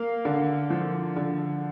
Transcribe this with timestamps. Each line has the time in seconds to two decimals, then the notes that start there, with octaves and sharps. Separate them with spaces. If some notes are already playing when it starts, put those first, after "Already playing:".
Already playing: A#3 F5
0.25 D3
0.70 F3
1.16 D3